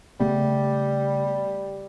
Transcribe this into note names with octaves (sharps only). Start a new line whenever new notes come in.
C#3 G3 A3 B3